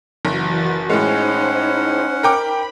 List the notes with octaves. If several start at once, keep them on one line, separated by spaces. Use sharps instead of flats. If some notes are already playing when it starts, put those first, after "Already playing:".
F#1 E3 F#4 A6
A2 G#3 C#4 D#4 C5 F#5
A#4 G5 B5 D6